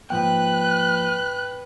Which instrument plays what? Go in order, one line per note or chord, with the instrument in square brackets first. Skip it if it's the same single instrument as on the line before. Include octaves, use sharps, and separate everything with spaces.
[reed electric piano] G#2 G5 [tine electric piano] F3 A#3 [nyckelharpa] B4 [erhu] F#6